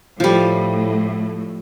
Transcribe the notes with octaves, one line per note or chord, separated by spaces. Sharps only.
A2 F3 G3